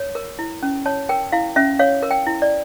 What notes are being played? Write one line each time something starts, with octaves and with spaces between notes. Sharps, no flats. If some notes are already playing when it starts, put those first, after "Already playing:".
Already playing: C#5
A#4
E4
C#4
C#5 A5
A#4 G5
E4 F5
C#4 E5
C#5 F5
A#4
G5
E4
D5